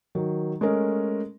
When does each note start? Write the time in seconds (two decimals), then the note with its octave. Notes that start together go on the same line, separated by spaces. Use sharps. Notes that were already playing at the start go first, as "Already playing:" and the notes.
0.15 D#3 F#3
0.61 G#3 A3 C#4 A#4 D#5